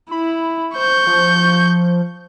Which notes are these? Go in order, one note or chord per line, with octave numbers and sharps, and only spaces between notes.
E4 B5
C5 C#6 G6
F3